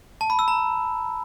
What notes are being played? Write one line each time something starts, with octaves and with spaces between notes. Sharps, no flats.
A5
B5
E6
A#5